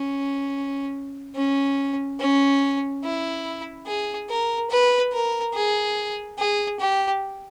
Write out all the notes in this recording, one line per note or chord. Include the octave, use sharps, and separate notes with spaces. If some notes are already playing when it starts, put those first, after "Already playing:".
Already playing: C#4
C#4
C#4
E4
G#4
A#4
B4
A#4
G#4
G#4
G4